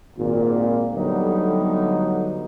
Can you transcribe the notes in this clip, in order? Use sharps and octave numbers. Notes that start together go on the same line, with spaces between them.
G#1 A#2
D3 F#3 G3 A3 B3 D#4